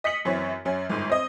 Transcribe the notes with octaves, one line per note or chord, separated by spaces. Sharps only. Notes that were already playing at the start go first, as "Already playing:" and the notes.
D#5 B6 C#7 F#7
F#2 E3 C4 C#5
F#2 C#4
G1 G#2
C4 D#5